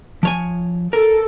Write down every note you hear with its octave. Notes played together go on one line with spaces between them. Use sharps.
F3 C#5 G#5
A4 A#4